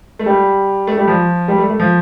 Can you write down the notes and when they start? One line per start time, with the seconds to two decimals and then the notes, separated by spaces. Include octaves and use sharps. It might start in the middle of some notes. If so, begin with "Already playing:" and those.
0.19 A3
0.26 G3
0.87 A3
0.97 G3
1.08 F3
1.48 G3
1.58 A3
1.69 A3
1.80 F3